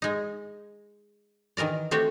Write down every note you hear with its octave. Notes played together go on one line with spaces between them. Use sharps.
G#3 D#4
D#3 E3 A#4 D5
A3 C4 F#4 G4